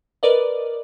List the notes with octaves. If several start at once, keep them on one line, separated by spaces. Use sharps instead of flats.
A#4 B4 D5 D#5